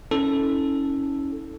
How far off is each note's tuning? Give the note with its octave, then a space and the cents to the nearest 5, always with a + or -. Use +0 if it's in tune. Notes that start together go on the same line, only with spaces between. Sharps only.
C#4 +0 E4 -40 A4 +0